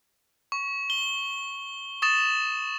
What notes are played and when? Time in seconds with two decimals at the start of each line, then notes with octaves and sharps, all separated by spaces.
0.52 C#6
0.90 G7
2.02 C#6 D#6 A6 E7